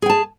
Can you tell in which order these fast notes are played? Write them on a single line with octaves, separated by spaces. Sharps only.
G#4 G5 A5